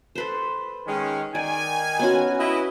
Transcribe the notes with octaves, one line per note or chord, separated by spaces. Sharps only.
A4 B4 C5
D#3 G#3 C#4
D#3 D5 G#5
B3 C#4 F#4
E4 B4 D#5